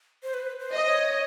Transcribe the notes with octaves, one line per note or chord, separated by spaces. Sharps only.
C5
B4
C5
D#5
C#5